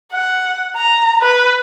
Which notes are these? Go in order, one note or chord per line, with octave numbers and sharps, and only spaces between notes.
F#5
A#5
B4